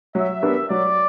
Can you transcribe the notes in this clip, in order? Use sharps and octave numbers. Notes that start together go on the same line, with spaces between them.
F#3 E5
B3 D4 G4 A#4
F#3 D5